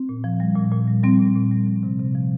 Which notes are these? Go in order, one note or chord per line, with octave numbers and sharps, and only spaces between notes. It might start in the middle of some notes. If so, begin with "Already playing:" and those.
Already playing: C4
A#2
F3
G3
A#2
A#2
G3
G3 C4
A#2
A#2
G3
F3
C3
C3
F3